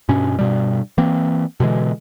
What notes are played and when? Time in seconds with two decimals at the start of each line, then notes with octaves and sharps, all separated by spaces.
0.09 G2 B2 C#4
0.39 G2 B2 G3
0.98 E3 A#3 C4
1.60 B2 D3 E3 G#3